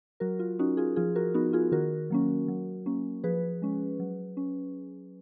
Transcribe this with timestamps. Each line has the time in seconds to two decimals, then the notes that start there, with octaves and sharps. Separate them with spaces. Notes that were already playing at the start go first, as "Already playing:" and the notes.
0.20 F#3 F#4 A#4
0.39 F4
0.59 C#4 D#4 F#4
0.77 F4 G#4
0.96 F3 F4 G#4
1.16 F#4 A#4
1.34 B3 D#4 F#4
1.53 F4 G#4
1.72 D#3 F#4 A#4
2.10 F#3 A#3 C#4
2.48 F#3
2.86 A#3 C#4
3.23 F3 G#4 B4
3.62 G#3 C#4
4.00 F#3
4.37 C#4